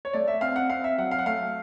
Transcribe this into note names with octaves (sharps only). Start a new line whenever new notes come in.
C#5
A3 D5
E5
C4 F5
F#5
C4 F5
E5
F#3 F#5
F5
F#5
A3 F5